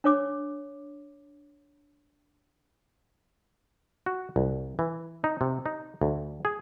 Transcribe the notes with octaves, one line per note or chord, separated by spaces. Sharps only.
D4 C#5 D6
F#4
C2
E3
D#4
C3
D#4
D2
G#4